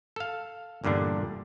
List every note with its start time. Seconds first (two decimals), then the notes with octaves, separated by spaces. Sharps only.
0.16 A4 F5
0.84 E2 G2 A#2 D3 D4